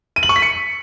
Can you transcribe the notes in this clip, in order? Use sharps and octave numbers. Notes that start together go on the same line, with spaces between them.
D#7
F#7
C#6
B6
C#7